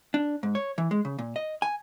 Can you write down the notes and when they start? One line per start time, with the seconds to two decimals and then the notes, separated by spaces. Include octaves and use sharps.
0.14 D4
0.43 G#2
0.55 C#5
0.78 E3
0.91 G#3
1.05 C#3
1.19 A#2
1.36 D#5
1.62 G#5